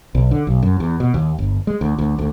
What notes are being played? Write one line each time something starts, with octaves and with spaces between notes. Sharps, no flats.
B1
D3
B1
F#2
E2
B2
D#2
G1
G#3
D2
D2
D2